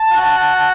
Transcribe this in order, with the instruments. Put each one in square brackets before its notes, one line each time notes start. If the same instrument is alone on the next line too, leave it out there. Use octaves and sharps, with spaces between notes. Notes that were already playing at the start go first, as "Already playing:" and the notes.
Already playing: [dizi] A5
[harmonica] F#4